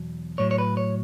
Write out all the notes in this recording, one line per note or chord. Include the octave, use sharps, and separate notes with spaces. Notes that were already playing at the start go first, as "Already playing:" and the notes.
Already playing: E2 B2 F#3
A2 F#3 C#5
C#5
B4
C#5